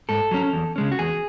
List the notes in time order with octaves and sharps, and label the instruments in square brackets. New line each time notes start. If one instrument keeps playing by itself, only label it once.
[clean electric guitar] G#2 A4
F#3 C#4
E2
C#3 G#3 C#4
F#4
E2 G#4